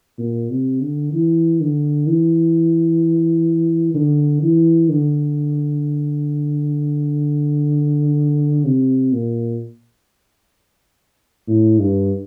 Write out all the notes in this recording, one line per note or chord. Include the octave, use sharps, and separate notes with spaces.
A#2
C3
D3
E3
D3
E3
D3
E3
D3
C3
A#2
A2
G2